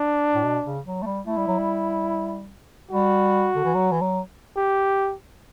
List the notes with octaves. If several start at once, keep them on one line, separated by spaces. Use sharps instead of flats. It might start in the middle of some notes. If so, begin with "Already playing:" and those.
Already playing: D4
A2
B2
C#3
F#3
A3
G3
A3 E4
G3
F#3
G3
G3 F#4
D3
E3
F#3
E3
F#3
G4